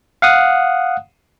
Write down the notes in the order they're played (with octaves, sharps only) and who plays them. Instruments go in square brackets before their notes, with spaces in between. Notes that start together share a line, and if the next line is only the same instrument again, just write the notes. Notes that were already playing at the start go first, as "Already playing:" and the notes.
[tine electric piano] F5 F#5 D#6